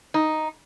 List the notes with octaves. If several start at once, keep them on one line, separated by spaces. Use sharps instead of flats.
D#4